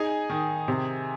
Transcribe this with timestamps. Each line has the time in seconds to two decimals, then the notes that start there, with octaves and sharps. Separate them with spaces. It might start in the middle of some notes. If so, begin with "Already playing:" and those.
Already playing: D#4 G#4 G#5
0.30 D#3
0.68 C3